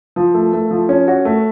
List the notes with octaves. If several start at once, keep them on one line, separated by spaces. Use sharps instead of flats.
F3
A3
A3
F3
C#4
F#4
A3